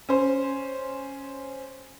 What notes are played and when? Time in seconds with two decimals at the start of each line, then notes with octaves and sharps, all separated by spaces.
0.09 C#4 C5